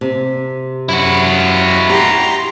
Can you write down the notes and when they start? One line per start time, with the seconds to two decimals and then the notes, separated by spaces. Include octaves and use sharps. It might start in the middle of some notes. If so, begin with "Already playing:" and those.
0.01 C3
0.89 F#2 E4 F#4
1.90 G4 G5 A#5 C6